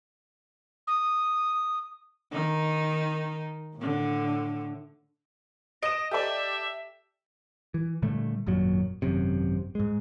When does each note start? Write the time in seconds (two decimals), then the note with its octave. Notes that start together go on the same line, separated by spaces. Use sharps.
0.87 D#6
2.32 D#3 D#4
3.77 A2 D3
5.83 D#5 A#6 D7 E7
6.11 G4 A4 D5 E5
7.74 E3
8.02 A#2 D3 G3 A3
8.47 G#1 F#2 A#2 F#3
9.02 G#1 F#2 C3
9.75 G#2 G#3